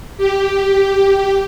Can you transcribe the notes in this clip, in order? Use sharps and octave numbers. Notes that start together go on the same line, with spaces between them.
G4